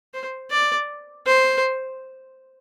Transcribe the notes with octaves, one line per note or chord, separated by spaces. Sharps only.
C5
D5
C5